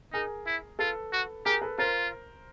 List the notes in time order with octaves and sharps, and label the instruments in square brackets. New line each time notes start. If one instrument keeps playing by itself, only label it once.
[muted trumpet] D#4 [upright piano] G#4 A#4
[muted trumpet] E4
[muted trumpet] F4 [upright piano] A4 B4
[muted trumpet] F#4
[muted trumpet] G4 [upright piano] G#4 A#4
[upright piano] A4 B4
[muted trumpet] F4 [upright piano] A#4 C5